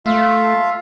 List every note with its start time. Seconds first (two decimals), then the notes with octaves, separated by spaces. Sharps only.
0.06 A3 F4 E5 F5